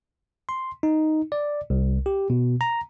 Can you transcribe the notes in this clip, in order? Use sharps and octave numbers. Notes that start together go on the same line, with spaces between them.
C6
D#4
D5
C2
G4
B2
A#5